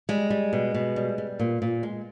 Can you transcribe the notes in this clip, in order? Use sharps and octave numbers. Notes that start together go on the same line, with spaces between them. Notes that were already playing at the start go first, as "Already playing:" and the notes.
G3 G#3
G3
B2
B2
G3
G3
A#2
A#2
G#3